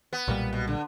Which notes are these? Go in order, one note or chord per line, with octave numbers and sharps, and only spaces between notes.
B3
B1 A#2 G3
B2
D3